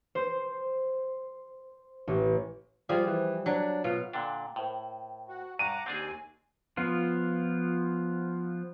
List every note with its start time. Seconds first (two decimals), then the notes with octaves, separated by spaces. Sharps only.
0.15 C5
2.08 A1
2.89 F3 G3 F4 G#4
3.07 E3
3.46 F#3 D4
3.84 B2 F4
4.13 A#2 D3 D4 G5
4.56 A2 A#4 C5 G5
5.29 F#4
5.59 G2 F#5 A#5 C#6 D6 D#7
5.86 D#2 C4 D4 G#4 G#5
6.77 F3 B3 F4